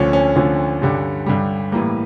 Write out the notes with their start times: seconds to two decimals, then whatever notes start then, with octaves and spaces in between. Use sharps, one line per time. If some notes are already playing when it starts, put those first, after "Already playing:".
Already playing: D2 D3 F3 C#4
0.13 C#4
0.36 D2 D3 F3 C#4
0.82 G2 D3 G3
1.26 G2 D3 G3
1.72 A2 E3 G3 A#3